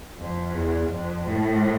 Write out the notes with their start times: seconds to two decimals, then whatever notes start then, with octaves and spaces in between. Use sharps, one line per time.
0.17 F2
0.54 E2
0.91 F2
1.27 A2